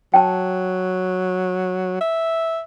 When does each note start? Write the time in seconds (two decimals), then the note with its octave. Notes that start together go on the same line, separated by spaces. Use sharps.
0.14 F#3 G5 A5
2.01 E5